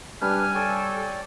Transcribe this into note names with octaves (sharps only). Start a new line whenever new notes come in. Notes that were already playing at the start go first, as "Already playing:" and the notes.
G3 D4 B4 G#5 F6
A4 C#5 D5 G5